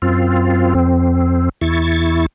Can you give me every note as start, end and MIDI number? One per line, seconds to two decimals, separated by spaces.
0.02 0.74 42
0.02 0.74 60
0.02 0.74 65
0.75 1.49 41
0.75 1.49 60
1.61 2.26 40
1.61 2.26 64
1.61 2.26 85
1.61 2.26 93